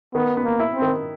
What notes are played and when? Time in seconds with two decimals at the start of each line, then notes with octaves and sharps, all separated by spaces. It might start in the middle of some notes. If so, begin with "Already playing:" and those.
0.14 D#3 B3
0.37 B3
0.44 A#3
0.60 E4
0.74 C4
0.82 D#3